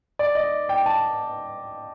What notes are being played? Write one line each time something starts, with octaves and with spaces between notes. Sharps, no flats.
D5
D#5
G5
A5